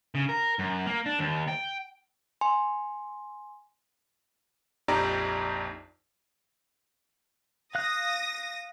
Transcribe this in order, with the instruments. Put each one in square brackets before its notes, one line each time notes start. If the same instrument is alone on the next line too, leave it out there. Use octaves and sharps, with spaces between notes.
[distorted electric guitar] C#3
A#4
F#2
A#3
D4
D#2
G5
[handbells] G#5 C6
[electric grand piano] A#1 F2 D#4 G4 D5 A#5
[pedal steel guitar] F5 F#6 [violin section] D#6 A#6